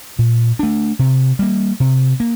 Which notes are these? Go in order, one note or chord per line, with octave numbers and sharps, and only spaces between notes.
A#2
A3 D4
C3
G3 A#3
C3
A#3